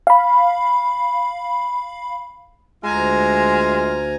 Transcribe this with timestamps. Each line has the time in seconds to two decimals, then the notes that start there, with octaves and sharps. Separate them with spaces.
0.07 F5 B5
2.84 D2 G#3 F4 G#5 A#5